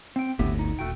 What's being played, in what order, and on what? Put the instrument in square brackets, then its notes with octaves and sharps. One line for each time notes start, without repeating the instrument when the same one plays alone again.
[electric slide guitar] C4 G5
[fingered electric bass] G1 D2 A2 [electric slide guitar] B3 G4 E5
[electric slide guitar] D#4
[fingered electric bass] D#1 [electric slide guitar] A3 F#4 G5